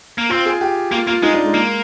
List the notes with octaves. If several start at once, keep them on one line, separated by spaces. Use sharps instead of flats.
A#3
C4 F4
G#4
G4
A#3 F4
A#3 F4
G#3 D#4
D4
G#3
A#3